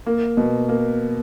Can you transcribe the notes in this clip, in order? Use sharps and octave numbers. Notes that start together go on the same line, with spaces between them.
A#3
B2
A#3